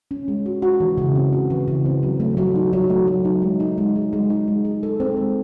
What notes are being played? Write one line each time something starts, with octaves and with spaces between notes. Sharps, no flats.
C#4
G#3
F#4
F#4
E3
C#3
C4
F#4
E3
C#3
C4
F#3
A3
F#3
D#4
F#3
A3
F#3
D#4
G#3
D#4
G#3
G#4
G#3
D#4
G#3
G#4
A4
C4
G#3